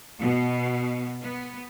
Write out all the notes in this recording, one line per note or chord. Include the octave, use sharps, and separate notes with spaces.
B2
B3